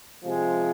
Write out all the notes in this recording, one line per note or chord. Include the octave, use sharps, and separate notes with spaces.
C3 F3 G#3